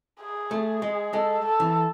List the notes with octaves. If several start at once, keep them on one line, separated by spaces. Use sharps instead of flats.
G#4
A3
G#4
G#3
G#3 A4
A4
E3